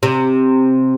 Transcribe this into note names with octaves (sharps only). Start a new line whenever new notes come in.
C3